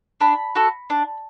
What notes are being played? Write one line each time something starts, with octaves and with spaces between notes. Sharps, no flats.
D4 B5
F#4 A4
D4